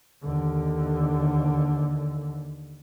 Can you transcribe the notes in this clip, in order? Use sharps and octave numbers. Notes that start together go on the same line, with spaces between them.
D#2 D3